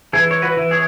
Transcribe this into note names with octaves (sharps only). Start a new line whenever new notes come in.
E3 G#4
C#5
F#4 B4
E3
G#4 C#5